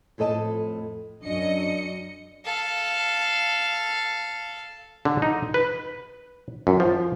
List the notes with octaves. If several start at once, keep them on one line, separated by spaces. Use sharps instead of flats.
F2 A2 A4 D#5 A5
F#2 D4 D#5 C#7
A4 F5
D3
D#4
B4
F#2
F3